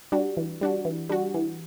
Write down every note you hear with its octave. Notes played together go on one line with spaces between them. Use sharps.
G3 D4 F#4
E3
G3 D4 F#4
E3
G3 D4 F#4
E3